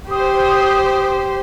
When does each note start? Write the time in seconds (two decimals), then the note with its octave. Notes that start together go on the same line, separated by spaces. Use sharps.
0.11 G4 C5 D#6